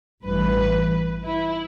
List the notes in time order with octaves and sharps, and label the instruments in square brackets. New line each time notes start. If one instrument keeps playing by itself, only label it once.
[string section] A1 G2 E3 B4
E4